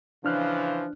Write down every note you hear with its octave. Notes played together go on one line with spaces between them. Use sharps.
C#3 E3 F3 D4 F6 F#6